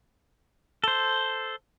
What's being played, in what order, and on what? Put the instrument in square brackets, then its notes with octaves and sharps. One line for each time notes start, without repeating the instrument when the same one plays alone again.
[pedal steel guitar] A4 C5